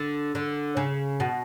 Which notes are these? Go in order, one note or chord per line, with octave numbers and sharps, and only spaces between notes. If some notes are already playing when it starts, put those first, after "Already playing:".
Already playing: D3
D3
C#3
B2